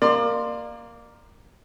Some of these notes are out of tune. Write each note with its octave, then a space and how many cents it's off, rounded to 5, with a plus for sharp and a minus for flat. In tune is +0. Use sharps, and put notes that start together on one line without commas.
A#3 +0 D5 +35 C6 +0